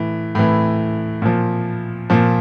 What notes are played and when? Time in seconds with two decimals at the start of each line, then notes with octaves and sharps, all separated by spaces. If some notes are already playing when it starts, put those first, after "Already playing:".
Already playing: A2 E3
0.35 A2 E3
1.22 A#2 F3
2.10 A#2 F3